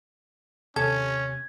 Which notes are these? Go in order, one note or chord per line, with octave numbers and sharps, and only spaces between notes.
D#2 C3 C#4 A4 G#6